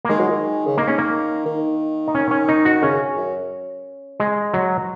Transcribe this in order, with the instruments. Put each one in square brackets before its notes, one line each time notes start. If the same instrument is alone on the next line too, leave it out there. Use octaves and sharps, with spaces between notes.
[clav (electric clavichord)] A#3
[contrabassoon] D#3 [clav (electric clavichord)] G#3
[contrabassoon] F#3
D#3
C#3
[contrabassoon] D#3 [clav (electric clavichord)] A#3
[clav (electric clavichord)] C#4
A#3
[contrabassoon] D#3
[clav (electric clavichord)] D#4
C#4
C#4
D#4
F#4
[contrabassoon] C#3 [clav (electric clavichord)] C#4
[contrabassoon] F#2
[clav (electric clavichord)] G#3
F#3